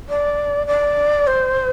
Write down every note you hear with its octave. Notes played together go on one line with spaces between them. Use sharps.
D5
D5
C5